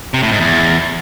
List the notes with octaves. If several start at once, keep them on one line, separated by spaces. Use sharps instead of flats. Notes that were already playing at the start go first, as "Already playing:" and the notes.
C3
A2
G#2
E2